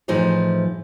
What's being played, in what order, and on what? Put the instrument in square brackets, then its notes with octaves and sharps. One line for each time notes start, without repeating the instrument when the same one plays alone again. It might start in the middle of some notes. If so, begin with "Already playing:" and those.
[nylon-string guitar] A2 E3 F3 D#4 G#4 C5